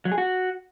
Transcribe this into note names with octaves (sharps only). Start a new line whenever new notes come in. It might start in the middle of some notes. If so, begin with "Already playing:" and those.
F#3
G#4
F#4